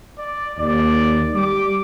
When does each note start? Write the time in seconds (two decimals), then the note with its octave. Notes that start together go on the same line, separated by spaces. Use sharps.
0.18 D5
0.59 D#2 D5
1.34 G3 D6